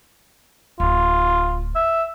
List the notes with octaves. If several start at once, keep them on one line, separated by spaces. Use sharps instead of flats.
D1 F4
E5